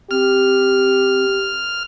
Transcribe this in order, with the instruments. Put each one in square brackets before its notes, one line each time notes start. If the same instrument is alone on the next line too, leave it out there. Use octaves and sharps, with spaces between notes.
[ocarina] C4 [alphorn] G4 [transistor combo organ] F6